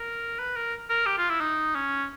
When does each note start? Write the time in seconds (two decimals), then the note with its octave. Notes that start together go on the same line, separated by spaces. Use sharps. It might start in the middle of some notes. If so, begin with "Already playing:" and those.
Already playing: A#4
0.39 B4
0.56 A#4
0.90 A#4
1.06 G4
1.18 F4
1.29 E4
1.41 D#4
1.75 C#4